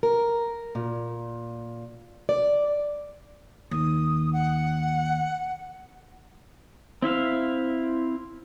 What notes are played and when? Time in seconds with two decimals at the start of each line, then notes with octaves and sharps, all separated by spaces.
0.03 A#4
0.75 A#2
2.29 D5
3.71 D#2 D#6
4.33 F#5
7.02 C4 E4 E5 F5